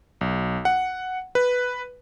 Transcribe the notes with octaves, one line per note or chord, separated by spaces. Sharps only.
B1
F#5
B4